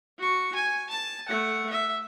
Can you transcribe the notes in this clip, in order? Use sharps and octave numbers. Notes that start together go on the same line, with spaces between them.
F#4 C#6
G#5
A5
A3 F#5
E5